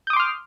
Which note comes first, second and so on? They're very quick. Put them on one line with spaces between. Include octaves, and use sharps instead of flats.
G6 D#6 D6 C6 F6